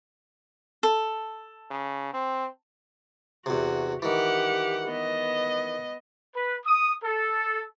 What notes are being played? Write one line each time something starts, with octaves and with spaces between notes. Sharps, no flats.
A4
C#3
C4
E2 C3 F#4
D#3 E3 G4 F#5
B3 D#5
B4
D#6
A4